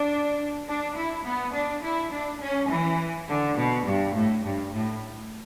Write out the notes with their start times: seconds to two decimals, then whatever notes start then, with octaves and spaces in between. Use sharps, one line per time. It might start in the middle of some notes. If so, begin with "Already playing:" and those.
Already playing: D4
0.67 D4
0.95 E4
1.25 B3
1.53 D4
1.83 E4
2.12 D4
2.40 C#4
2.69 E3
3.28 D3
3.56 B2
3.85 G2
4.13 A2
4.43 G2
4.72 A2